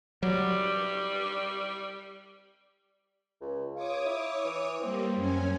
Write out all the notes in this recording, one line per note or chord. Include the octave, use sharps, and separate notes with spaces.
F#3 G3
C#2
F4 C#5 D6 D#6
E4
E3
G3 A#3 C4
F#2 C#4 G#5